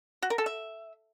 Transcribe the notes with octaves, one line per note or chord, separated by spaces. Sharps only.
F#4
A#4
A4
E5